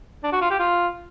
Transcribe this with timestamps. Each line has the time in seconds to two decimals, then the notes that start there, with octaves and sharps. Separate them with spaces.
0.23 D4
0.32 F#4
0.41 F4
0.50 G4
0.59 F4